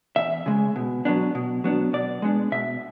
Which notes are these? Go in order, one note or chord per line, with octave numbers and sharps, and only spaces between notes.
E2 E5
C#3 G#3
B2
F#3 B3 D4
B2
F#3 B3 D4
B2 D5
G#3 B3 D4
B2 E5